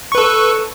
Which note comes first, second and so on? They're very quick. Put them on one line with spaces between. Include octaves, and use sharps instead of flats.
C#6 B4 A4